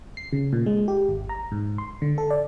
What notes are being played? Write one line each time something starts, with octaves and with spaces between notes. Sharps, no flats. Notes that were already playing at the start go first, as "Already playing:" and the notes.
C7
C#3
A#2
G#3
G4
G#1
A#5
G#2
C6
D3
A4
D5